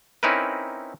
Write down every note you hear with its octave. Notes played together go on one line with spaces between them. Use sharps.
C4 C#4 D#4 E4 A#4 B4